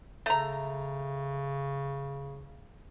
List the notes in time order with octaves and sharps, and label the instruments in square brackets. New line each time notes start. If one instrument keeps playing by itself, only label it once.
[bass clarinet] C#3 [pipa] A3 A#5